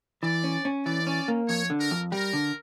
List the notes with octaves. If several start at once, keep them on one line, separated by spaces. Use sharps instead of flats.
E3 D5
C#4
C#4
E3 D5
C#4
A#3
F2 C#5
D3
A#4
F2
G3 A#4
D3